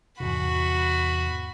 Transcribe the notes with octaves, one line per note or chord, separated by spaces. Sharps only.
E2 G#2 C3 F#4 B5